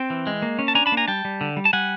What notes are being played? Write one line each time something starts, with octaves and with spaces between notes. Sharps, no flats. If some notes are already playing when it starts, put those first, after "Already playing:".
Already playing: C4 G5
E3
G#3
A#3
C#4
A5
D4 G#5 A#5
A5 B5
A#3
G#5 A#5
G3 G5 A5
G3
D3
G3
A5
G3 F#5 G#5